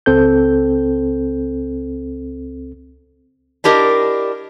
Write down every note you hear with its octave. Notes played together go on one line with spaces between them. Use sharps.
C#2 C4 A4 G6
D4 E4 G4 A#4 D#5